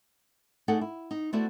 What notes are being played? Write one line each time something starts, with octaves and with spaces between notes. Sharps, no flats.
A3 D4 D#4 G#4 A4 F#5
E4
D#4
A3 B3 E4 F#4 C5 D5